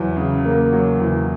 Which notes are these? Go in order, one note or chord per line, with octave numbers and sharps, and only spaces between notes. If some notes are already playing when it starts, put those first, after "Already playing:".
Already playing: E2 F#3
C#3
A#3
F#3
E2